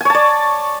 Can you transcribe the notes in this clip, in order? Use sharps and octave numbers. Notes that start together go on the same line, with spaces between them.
C#5 D5 G#5 A5